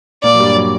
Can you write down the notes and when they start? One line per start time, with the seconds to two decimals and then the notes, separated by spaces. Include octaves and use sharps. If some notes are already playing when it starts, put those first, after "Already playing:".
0.23 A#2 A#3 D5
0.34 F#3
0.40 G2 G3
0.55 F#3